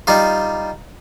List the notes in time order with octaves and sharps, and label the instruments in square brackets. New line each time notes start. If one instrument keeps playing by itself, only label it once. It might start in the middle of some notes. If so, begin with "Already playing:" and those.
[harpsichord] G3 D#4 F4